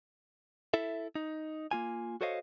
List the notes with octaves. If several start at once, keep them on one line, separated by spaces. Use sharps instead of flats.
E4 A4 E5
D#4
A#3 F4 G#5
F#4 A4 C5 C#5 D#5 F5